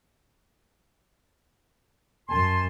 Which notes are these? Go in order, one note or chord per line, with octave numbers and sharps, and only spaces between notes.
F#2 G#5 A5 C6